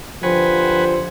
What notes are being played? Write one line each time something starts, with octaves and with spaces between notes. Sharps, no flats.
D3 F3 G4 B4 C5 F#5 G#5